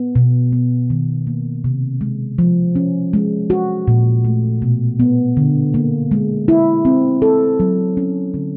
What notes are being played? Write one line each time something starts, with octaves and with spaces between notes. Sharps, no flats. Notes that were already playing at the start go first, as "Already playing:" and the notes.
Already playing: B3
B2
B3
D#3
A#3
C3
G#3
F3
C#4
G#3
F#4
A#2
A3
B2
B3
D3
A#3
G#3
E4
C4
A4
F#3
C#4
D3